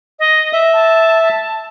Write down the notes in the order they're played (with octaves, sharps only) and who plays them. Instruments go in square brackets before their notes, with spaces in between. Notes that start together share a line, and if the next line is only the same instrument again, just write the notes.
[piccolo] D#5
[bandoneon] E5
[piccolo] A5